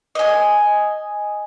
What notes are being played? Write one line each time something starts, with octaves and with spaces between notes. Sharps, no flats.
D#5 G#5